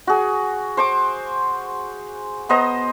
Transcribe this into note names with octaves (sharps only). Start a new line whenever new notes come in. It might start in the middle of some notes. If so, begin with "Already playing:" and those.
F#4 G#4
C5 C#6 D6
B3 C5 D#5 A#5